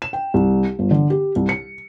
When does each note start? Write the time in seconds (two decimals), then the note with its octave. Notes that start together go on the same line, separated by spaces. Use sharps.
0.02 E7
0.13 G5
0.34 C2
0.79 G1
0.91 D3
1.10 G4
1.36 C2
1.49 C#7